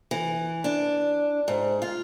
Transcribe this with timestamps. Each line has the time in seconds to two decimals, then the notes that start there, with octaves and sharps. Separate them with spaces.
0.11 E3
0.64 D4
1.48 G#2
1.82 F4